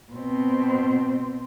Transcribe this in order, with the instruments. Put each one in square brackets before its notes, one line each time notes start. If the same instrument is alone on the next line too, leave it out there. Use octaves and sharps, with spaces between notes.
[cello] B2 C4